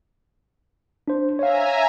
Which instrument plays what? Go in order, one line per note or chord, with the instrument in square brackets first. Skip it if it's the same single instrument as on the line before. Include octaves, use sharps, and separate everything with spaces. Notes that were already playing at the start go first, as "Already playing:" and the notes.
[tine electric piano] D4 C5
[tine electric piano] C#5 F5 [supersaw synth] E5 G#5 A#5